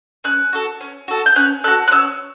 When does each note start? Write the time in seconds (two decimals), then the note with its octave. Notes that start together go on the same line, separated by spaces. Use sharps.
0.24 C#4 F#6
0.53 F#4 A4
0.81 C#4
1.08 F#4 A4
1.26 G6
1.36 C#4 F#6
1.64 A4 F#6
1.67 F#4
1.88 F#6
1.91 C#4 E6